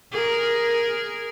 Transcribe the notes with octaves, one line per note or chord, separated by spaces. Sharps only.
G#4 A#4